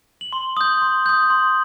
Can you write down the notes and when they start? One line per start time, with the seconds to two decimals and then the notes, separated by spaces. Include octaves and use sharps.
0.21 F#7
0.33 C6 G7
0.57 D#6 G6
0.82 C6
1.06 D#6 G6
1.30 C6